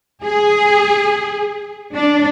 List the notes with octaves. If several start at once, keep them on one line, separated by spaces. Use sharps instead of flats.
G#4
D4